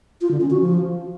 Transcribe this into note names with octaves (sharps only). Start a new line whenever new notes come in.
F4
D3
C#4
F#4
F3